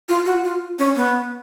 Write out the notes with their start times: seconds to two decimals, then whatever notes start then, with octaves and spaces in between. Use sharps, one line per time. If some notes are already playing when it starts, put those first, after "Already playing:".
0.09 F4
0.26 F#4
0.44 F4
0.79 C#4
0.96 B3